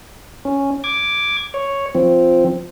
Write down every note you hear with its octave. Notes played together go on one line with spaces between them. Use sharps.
C#4
D6 G#6
C#5
F3 C4